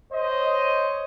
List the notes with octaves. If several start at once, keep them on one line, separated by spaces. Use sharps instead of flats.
C5 C#5 D#5